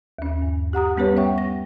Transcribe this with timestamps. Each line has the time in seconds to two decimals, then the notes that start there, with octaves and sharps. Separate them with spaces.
0.19 D#2 C#4
0.42 G2
0.73 G4 F#5 A#5 D#6
0.97 G3 B3 C#4 G4 B4 C#5
1.16 C#5 E5 F#5 G5 C#6
1.38 A#6